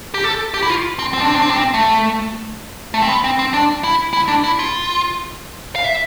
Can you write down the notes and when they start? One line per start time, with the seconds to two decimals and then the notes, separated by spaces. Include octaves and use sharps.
0.14 G4
0.24 A4
0.54 G4
0.62 E4
0.70 F4
0.99 C4
1.14 C4
1.21 D4
1.28 C4
1.35 D4
1.42 C4
1.50 D4
1.56 C4
1.74 A3
2.94 A3
3.02 C4
3.08 B3
3.24 C4
3.39 C4
3.54 D4
3.84 E4
4.13 E4
4.29 D4
4.44 E4
4.59 F4
5.75 F5
5.84 E5